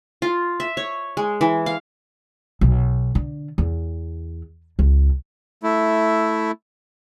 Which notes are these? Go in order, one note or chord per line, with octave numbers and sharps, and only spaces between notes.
F4
E5
C#5
G#3
E3
F5
B1
D3
E2
C#2
A3 E4